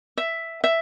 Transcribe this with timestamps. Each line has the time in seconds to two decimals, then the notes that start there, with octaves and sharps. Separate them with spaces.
0.17 E5
0.64 E5